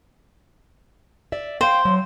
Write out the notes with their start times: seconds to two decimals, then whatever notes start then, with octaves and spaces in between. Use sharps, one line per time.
1.32 D5 E5
1.61 C5 F5 G5
1.85 F#3